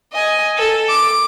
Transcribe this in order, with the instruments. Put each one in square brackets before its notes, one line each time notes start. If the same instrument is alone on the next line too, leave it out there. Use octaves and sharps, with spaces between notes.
[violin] D#5 G#5
A4
D6